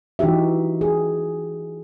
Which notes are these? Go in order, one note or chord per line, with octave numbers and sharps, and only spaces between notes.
E3 D#4 F#4 G4 E5
G#4